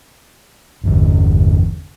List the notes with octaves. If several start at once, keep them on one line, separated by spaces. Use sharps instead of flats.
G1 E2 D3